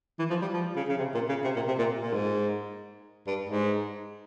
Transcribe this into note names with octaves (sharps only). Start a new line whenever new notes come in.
E3
F3
G3
F3
C#3
C#3
C3
A#2
C#3
C3
A#2
C3
A#2
A#2
G#2
G2
G#2